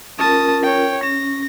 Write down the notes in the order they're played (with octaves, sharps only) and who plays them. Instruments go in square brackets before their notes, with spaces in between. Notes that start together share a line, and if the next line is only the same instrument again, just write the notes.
[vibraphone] C#4 F4 A#4 [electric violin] A5 D#6
[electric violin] C#5 G5
[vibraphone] C#4 [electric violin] A#6